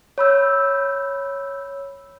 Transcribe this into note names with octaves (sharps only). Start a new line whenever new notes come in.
C#5 B5 E6 G6